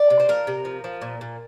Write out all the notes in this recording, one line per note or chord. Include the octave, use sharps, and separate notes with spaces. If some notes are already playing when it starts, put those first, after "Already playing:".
Already playing: D5
C3
C5
F3 A#4
C3
F3
F3
A#2
A#2